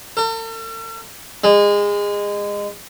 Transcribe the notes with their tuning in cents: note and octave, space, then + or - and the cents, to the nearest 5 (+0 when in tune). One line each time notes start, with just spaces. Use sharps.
A4 +45
G#3 -25